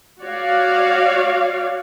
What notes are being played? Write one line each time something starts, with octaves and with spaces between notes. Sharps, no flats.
F#4 C#5 D5 F5